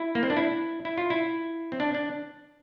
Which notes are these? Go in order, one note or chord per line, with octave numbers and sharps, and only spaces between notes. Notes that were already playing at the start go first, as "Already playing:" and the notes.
Already playing: E4
A#3
C4
D4
E4
E4
F4
E4
C4
D4
D4